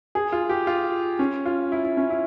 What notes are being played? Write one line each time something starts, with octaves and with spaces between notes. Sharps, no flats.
G#4
F4
G4
F4
C#4
F4
E4
E4
C#4
E4